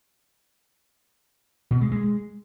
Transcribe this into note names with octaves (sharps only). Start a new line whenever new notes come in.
B2
G#3
G#3